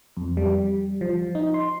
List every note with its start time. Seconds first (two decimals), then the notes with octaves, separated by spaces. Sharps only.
0.17 F2
0.37 G3
1.01 F3
1.35 D#4
1.54 C6